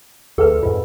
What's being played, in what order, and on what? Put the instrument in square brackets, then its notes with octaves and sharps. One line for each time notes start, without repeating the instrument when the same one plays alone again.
[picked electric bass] D2 D3 [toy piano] G#4 B4 [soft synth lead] A4
[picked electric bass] F2 G#2 [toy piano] F4